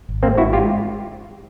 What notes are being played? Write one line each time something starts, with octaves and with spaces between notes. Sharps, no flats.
G#1
G#2 A#3 C4
G#1 E4 F#4
G#3 F4 G4